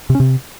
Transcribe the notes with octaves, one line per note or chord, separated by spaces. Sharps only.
C3
C#4
C3